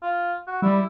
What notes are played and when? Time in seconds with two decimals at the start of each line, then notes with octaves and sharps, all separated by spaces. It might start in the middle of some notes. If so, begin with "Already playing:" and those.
0.03 F4
0.47 F#4
0.62 G3 E4